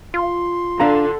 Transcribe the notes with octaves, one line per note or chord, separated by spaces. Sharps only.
F4 C6
D3 D4 F5 A#5